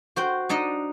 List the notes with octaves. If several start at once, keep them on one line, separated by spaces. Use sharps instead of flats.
F#4 C5 G5
D4 D#4 D5 D#5